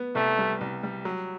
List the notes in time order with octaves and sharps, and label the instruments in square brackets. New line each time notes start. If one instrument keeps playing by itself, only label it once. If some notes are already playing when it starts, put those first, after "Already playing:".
Already playing: [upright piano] B3
[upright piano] C2 [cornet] A3
[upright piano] G3
C2
G3
F#3